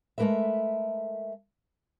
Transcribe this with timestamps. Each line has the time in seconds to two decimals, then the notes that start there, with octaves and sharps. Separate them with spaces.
0.18 G#3 A3 B3 A#4 B4 E5